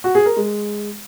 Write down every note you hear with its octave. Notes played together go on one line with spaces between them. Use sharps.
F#4
G#4
A#4
G#3